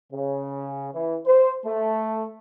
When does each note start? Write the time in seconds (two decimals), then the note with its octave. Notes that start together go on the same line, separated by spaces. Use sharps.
0.13 C#3
0.94 E3
1.26 C5
1.65 A3